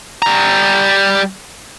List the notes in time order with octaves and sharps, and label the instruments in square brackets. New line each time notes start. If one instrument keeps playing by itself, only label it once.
[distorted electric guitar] G3 A#5